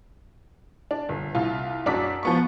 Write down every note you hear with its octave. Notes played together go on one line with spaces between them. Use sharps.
D4
G1
C2 F4
F#2 D4 F#4 D6 B6
F3 B3 C#6